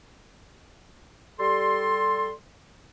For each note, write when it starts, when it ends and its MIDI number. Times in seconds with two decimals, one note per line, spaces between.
1.39 2.30 55
1.39 2.30 69
1.39 2.30 84